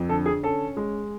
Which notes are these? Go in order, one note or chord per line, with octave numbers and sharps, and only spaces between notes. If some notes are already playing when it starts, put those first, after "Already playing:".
Already playing: F2
D3 A4
G#4
C#4 A4
G#3